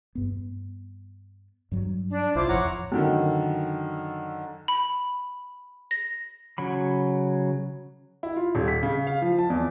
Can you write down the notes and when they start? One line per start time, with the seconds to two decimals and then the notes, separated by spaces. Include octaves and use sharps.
0.15 G2 B3
1.72 G2 F#3
2.10 D4
2.35 C2 E4 F4 C5 D6
2.49 A1 F2 C#5 F#5 A#5
2.92 F#2 D3 D#3
4.68 B5
5.91 A#6
6.58 C#3 F#3 B5
8.23 E4
8.36 F4
8.55 D#1
8.68 B6
8.83 C#3
9.07 F5
9.22 F3
9.39 A5
9.50 E2